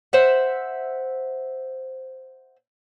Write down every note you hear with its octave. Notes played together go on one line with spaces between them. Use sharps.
C5 E5 F#5